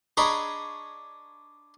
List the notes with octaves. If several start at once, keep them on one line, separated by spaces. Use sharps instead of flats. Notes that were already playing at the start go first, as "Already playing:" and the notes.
D4 G#4 C#5 D#5 A#5 B5